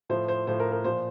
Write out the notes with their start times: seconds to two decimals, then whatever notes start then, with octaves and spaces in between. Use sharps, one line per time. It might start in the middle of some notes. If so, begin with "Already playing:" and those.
0.09 A2 F3 C5
0.28 C5
0.47 A2 F3 C5
0.60 A#4
0.72 A#4
0.84 A#2 F3 C5